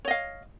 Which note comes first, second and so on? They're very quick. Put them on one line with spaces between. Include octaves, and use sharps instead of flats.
C#5 D#5 F5